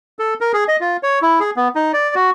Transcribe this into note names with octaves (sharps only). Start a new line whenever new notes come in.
A4
A#4
G#4
D#5
F4
C#5
E4
G#4
B3
D#4
D5
F#4